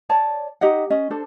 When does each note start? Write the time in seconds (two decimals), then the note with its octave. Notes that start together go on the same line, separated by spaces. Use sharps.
0.09 C#5 D5 A5
0.61 D#4 G4 D#5 F#5
0.90 C#4 D#5
1.10 D4 A4 C5